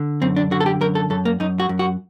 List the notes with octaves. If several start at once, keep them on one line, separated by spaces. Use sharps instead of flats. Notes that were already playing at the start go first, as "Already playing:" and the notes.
Already playing: D3
F#2 C4
D4
D3 F#4
A4
G4
F#2 A#4
A4
F#2 A4
A#3
F#2 D#4
F#4
F#2
F#4